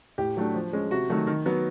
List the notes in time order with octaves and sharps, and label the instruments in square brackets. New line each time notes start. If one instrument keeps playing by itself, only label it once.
[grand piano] A2 G4
F#3 A3 D4
F3
G#3 C#4
C3 F#4
D#3 F#3 A3
D#3
F#3 B3